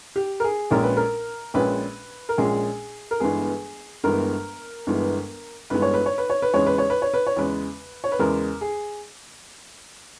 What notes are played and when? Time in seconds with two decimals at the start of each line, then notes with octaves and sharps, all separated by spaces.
0.16 G4
0.40 A#4
0.44 G#4
0.71 A#1 A#2 G#3 C#4 A#4
0.83 B4
0.97 A#4
1.54 A#1 A#2 G#3 C#4 B4
2.29 A#4
2.38 A#1 A#2 G#3 C#4 G#4
3.11 A#4
3.20 G1 G2 E3 G#3 B3 G#4
4.04 G1 G2 E3 G#3 B3 A#4
4.87 G1 G2 E3 G#3 B3
5.70 G1 G2 E3 G#3 B3 B4
5.82 C#5
5.94 B4
6.06 C#5
6.18 B4
6.30 C#5
6.42 B4
6.54 E2 C#3 G#3 C#5
6.67 B4
6.78 C#5
6.90 B4
7.02 C#5
7.14 B4
7.27 C#5
7.36 E2 C#3 G#3 B4
8.04 C#5
8.12 B4
8.19 E2 C#3 G#3 A#4
8.61 G#4